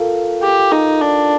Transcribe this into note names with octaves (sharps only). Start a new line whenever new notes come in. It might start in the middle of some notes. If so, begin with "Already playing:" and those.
Already playing: F4 A4 A#4 F5
G4
D#4
D4